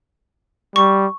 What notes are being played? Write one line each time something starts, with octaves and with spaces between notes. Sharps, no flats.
G3 C#6